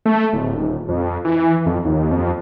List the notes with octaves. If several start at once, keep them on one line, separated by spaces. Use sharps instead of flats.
A3
D1
D#1
F2
E3
F2
D#2
F2